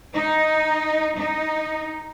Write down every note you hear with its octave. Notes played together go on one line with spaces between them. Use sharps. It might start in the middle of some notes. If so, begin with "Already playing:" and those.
D#4
D#4